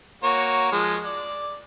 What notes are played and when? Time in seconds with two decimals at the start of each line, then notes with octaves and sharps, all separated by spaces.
0.23 A#3 F#4 C#5
0.72 F3 G#3
1.05 D5